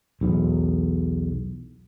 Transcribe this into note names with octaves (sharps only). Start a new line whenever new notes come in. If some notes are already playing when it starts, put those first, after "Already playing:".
B1 E2